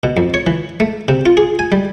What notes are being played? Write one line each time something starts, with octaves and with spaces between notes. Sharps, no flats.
B2
F2
C#5
E3
A3
C3
F4
G#4
G#5
G3